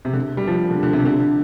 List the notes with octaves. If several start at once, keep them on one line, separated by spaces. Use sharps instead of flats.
C3
D3
G3
F3
D3
D3
C3
D3